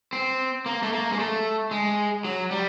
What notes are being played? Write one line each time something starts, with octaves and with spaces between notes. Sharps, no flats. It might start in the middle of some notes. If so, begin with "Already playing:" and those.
C4
A#3
A3
A#3
G#3
A3
G#3
F#3
G3